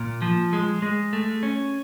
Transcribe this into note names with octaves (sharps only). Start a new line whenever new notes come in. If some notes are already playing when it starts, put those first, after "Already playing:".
Already playing: A#2
F3
G#3
G#3
A3
C#4